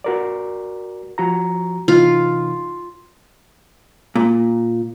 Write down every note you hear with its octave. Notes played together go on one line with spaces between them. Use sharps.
F#4 A#4 D5
F3 F#4 A#5
C3 E3 D#4 F4
A#2